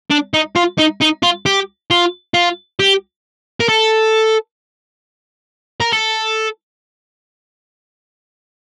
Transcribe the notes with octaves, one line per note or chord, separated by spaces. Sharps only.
D4
D#4
F4
D#4
D#4
F4
G4
F4
F4
G4
A#4
A4
A#4
A4